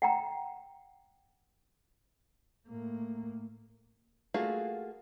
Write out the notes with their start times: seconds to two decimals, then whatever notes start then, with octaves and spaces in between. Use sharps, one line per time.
0.02 F#5 G5 A#5
2.68 A2 A#3
4.34 A3 A#3 F4 F#4 G#4